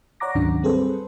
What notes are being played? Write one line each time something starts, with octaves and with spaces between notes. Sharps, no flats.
C#5 D5 F#5 A#5 D6 A#6
D2 G#2 D#3 F#3 C#4 D4
G3 C4 G#4 A4 B4 C5